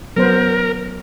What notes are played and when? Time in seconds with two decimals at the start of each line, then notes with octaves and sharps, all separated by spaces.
0.16 F#3 B3 A#4 C5